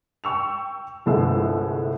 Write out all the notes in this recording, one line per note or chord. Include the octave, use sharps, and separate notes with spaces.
G5 C#6 E6 F7
G1 C2 G#3 A3 E6